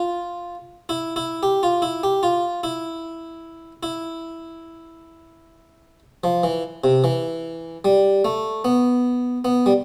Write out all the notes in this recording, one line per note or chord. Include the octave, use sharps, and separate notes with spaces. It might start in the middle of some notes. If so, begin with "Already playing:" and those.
Already playing: F4
E4
E4
G4
F4
E4
G4
F4
E4
E4
F3
E3
C3
E3
G3
A3
B3
B3
G3